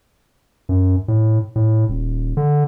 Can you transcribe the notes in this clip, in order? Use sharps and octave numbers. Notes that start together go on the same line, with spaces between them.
F#2
A2
A2
D#1
D3